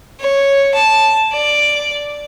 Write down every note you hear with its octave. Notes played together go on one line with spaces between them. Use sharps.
C#5
A5
D5